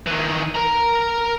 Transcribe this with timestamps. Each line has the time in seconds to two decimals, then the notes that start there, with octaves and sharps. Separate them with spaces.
0.07 D#3 E3
0.55 A#4 A#5